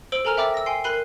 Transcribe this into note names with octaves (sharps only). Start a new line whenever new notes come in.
C5 E6 D7 F#7 G7
A4 A#4 G#5 A#5 F6 F7
E5 G5 B5 D6 E6 A6
E6 A#6
G5 G#5 C6 C7
A#4 B5 F#6 C7 D#7 G7